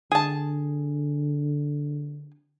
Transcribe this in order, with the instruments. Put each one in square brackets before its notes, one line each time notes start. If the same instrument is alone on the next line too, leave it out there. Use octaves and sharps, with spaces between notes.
[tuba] D3 [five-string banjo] G#4 A5